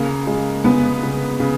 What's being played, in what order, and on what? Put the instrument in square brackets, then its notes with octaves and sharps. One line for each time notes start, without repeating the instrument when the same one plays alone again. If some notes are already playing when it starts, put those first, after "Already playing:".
Already playing: [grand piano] C#3 [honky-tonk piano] A#3
[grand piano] G#3
[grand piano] C#3 [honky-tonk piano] B3
[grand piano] C#3
C#3